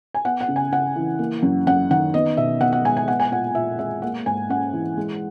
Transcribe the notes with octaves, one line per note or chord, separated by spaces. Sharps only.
G#5
B3 F#5
F#5
C#3
G#5
C#3 F#5
E3
A#3
F#2
F#2 F#5
D#3 F#5
B3 D#5
B2 E5
B2 F#5
F#5
G#3 G#5
G#5
B3 F#5
G#5
A#2 F#5
A#2 E5
G#3 E5
A#3 F#5
G#2 G#5
C#4 F#5
E3
G#3